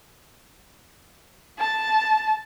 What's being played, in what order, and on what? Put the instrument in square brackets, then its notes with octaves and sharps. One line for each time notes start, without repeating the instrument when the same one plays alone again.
[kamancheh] A5